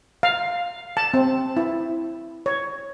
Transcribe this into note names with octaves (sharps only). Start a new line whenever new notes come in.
F5
A5
C4
E4
C#5